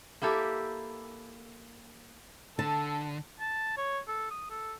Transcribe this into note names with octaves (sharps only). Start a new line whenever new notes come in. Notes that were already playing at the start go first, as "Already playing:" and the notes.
A#3 E4 G4 A4
D3 A4 A5
A5
C#5
A4
D#6
A4